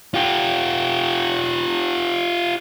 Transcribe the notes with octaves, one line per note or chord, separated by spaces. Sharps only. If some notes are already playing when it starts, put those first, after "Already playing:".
F4 G4